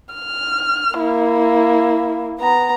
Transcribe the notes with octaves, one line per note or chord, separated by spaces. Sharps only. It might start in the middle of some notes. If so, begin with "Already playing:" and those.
F6
A#3 E4
B3 A#5